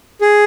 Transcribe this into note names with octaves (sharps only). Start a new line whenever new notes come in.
G#4